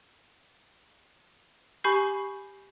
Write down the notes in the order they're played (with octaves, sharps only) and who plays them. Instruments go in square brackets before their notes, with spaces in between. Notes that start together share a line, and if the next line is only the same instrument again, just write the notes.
[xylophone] G4 G#5 B5 C#6 G6 C7